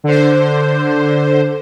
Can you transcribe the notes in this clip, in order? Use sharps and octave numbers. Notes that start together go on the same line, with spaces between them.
D3 C5